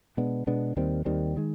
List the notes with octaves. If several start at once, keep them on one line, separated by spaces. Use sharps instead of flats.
B2 G#3 B3 D4
B2 G#3 B3 D4
D#2 D#3 G3 C4
D#2 D#3 G3 C4
D#3 G#3